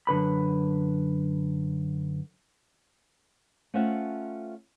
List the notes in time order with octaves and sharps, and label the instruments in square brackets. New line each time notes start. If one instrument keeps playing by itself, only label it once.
[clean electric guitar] F#2 D3 B4 B5
[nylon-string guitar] A3 C#4 F4 C5 E5 F#5